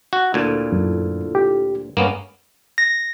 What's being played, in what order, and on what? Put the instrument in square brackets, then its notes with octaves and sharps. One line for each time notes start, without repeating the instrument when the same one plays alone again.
[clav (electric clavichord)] F#4
[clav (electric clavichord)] D2 A#2 [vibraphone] E4 F4 A4
[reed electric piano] F#2
G4
[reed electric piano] G2 [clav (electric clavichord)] A#3 B3 C#4
[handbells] A#6